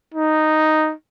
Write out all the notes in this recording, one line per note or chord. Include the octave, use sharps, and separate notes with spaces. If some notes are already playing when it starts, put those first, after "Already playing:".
D#4